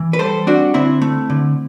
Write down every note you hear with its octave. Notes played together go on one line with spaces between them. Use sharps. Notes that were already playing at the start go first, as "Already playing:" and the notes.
Already playing: E3
B4
G3 A4 C5
C4 D4 F#4
D3 C4 E4
A3
D3